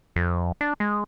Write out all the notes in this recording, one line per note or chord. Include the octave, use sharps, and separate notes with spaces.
F2
D4
G#3